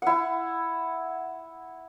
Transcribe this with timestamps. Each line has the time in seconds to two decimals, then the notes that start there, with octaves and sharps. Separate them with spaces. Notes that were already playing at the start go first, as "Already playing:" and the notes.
0.02 E4 F#5